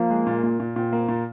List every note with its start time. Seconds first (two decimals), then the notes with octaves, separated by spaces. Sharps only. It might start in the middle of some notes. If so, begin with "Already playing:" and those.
Already playing: F3 A#3
0.10 G#3
0.27 A#2
0.43 A#2
0.60 A#2
0.76 A#2 C4
0.93 A#3
1.08 A#2